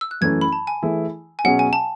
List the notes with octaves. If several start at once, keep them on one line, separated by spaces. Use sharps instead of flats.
E6
F#6
F#2 E3 A3 C#4 G#6
B5
A5
G#5
E3 A3 E4 G#4
G#5
B2 F#3 C#4 G#4 F#5
G#5
A5